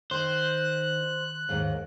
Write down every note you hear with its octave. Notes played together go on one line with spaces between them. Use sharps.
D#3 C5 F#6
D#2 G#2 D#3